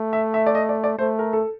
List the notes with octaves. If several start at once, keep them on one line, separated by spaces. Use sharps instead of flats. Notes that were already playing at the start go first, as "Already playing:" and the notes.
Already playing: A3
E5
E5
D5
D#5
D5
D5
A3 C5
A#4
A4